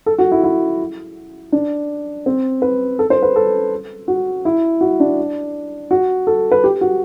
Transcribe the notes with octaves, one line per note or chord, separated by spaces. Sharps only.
A4
F#4
E4
E4
D4
C4
B4
A4
C5
B4
A4
F#4
E4
F#4
D4
F#4
A4
B4
G4
F#4